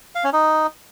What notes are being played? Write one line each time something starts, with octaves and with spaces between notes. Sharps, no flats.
F5
C#4
D#4